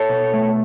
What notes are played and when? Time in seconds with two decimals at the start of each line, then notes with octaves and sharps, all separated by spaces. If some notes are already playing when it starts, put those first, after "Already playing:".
Already playing: A4 C#5
0.09 B2
0.34 A3